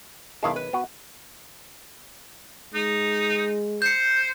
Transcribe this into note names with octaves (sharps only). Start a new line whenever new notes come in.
B1 D#3 G#3 E4 F5 A5
B4
B3 F#4
G#3 D#4
C5 G6 C#7